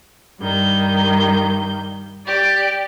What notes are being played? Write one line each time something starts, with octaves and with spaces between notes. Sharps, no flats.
G2 D#3 G6
G4 D5